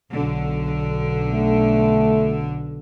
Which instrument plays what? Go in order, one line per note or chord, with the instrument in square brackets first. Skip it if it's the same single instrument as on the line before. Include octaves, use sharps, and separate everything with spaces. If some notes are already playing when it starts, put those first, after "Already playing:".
[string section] B1 D3
[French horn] A3